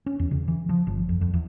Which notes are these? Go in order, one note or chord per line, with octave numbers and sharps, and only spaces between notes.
C#4
E2
C#3
E3
F3
G1
F2
F2
E2